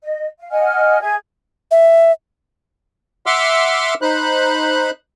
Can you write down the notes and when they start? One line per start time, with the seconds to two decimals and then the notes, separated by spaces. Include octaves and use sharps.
0.02 D#5
0.39 F5
0.51 D#5 F#5 G#5 F6
1.01 G#4 E5 G#5 G#6
1.71 E5
3.26 E5 F#5 C6 D6 E6 F6
4.02 D#4 C5 B5 F#6